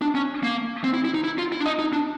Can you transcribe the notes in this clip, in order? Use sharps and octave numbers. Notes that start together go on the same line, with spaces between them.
D4
C#4
A#3
C4
E4
E4
D#4
E4
F4
E4
D4
D#4
D#4
D4